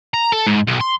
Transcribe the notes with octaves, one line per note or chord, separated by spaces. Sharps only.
A#5
A4
G#2
B1
C6